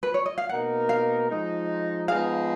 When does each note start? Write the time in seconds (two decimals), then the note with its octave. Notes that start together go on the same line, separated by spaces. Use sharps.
0.03 B4
0.14 C#5
0.26 D#5
0.38 F5
0.49 B2 A#3 D#4 A#4 F#5
0.89 F5
1.29 F3 G#3 D#4
2.08 F3 G#3 B3 D#4 G#4 F5